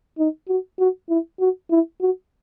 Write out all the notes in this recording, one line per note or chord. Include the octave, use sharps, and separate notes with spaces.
D#4
F#4
F#4
E4
F#4
E4
F#4